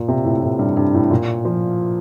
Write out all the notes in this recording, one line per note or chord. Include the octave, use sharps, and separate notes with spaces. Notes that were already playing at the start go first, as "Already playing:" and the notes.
Already playing: A#2
C3
A2
A2
G2
G2
A2
A#2
F3